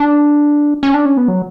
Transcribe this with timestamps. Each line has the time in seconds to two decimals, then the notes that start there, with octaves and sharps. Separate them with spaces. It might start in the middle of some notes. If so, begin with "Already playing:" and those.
Already playing: D4
0.83 C#4
0.94 D4
1.05 C#4
1.17 B3
1.28 F#3